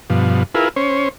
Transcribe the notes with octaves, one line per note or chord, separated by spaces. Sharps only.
G2 B2 F3
E4 F4 G#4 A#4 B4
C#4 C5 C#5